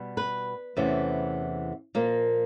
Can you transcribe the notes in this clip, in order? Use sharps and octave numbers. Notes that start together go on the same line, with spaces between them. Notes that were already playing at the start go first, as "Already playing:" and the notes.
Already playing: B2 G3 B3
B4
E2 C3 E3 A3 C#4
A#2 F3 A#3